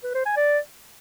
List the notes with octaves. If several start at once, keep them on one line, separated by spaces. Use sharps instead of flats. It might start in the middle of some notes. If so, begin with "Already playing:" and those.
B4
C5
G#5
D5